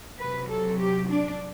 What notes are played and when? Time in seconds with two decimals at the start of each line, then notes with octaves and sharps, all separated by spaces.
0.18 C3 F#3 B4
0.49 A4
0.79 G4
1.09 D4